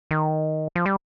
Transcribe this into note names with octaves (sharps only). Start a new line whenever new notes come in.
D#3
F3
G3